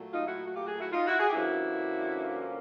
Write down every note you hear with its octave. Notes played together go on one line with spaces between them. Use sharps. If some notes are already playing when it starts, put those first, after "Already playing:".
Already playing: A#2 F#3 A3
D#4 F4
E4 F#4
F#4
F4 G4
F#4 G#4
E4 F#4
D#4 F4
E4 F#4
F#4 G#4
G4
G2 D3 F3 A#3 C#4 E4 F#4